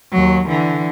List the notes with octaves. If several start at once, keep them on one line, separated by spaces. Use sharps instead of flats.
D#2 F#3
D3 E3